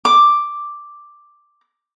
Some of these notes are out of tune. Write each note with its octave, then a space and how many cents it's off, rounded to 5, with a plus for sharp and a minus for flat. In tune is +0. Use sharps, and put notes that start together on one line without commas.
D6 +5